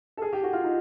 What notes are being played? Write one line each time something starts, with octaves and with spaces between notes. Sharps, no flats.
A4
G#4
G4
F#4
F4
D#4